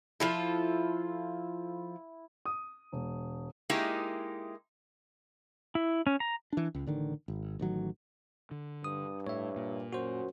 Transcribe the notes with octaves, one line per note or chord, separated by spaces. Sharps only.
F3 E4 F4 A4
D#6
E1
G#3 A#3 D#4 E4 G4
E4
C#4
A#5
E3 D4
C#2
A1 D3 D#3
G#1
A1 D#3 F#3
D3
G2 D#6
A2 C#5 E5
A#2
F#2 F#4 C5